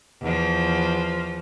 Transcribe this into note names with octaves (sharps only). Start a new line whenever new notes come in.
E2 F3